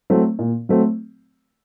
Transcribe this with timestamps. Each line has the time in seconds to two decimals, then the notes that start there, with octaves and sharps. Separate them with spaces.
0.10 F#3 A3 C4
0.39 A#2
0.69 F#3 A3 C4